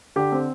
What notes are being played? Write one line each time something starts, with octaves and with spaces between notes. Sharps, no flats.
D3 G4
C4